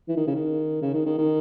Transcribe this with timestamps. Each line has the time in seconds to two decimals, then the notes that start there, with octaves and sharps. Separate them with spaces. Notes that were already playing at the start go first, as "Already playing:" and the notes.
0.08 E3
0.17 D#3
0.27 C#3
0.35 D#3
0.82 C#3
0.94 D#3
1.06 D#3
1.18 D#3